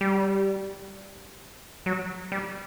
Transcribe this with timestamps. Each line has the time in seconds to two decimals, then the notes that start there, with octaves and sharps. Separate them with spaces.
0.01 G3
1.86 F#3
2.32 G3